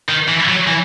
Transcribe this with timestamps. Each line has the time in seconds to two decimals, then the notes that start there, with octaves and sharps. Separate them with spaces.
0.09 D#3
0.28 E3
0.48 F#3
0.67 E3